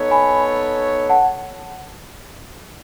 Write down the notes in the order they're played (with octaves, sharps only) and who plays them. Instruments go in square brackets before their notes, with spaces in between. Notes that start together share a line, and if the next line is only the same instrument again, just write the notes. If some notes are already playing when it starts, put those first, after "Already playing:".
Already playing: [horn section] B3 D#4 A4 C#5
[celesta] G#5 B5
F#5 A5